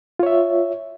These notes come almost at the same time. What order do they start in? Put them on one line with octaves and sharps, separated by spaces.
F4 C#5 E5